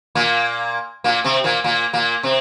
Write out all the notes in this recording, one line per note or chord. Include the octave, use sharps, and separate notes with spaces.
A#2 A#3
A#2 A#3
C3 C4
A#2 A#3
A#2 A#3
A#2 A#3
C3 C4